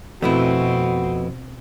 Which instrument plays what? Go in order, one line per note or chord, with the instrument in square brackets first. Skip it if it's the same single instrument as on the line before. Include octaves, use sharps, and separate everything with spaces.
[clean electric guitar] F2 [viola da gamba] B2 C4 [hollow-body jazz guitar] A3 B3 E4 [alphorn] F#4